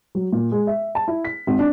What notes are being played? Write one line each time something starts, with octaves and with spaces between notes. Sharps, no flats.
F#3
A#2
G#3
E5
A5
E4
B6
G#1
D4